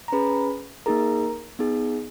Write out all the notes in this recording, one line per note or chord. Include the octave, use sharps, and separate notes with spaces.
A#5
C#4 G#4 B4 B5
A#3 D#4 G#4 A#4 A#5
B3 D#4 G#4